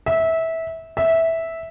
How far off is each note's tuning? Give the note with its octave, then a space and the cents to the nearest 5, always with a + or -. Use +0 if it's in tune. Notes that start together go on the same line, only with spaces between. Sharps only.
E5 -20
E5 -10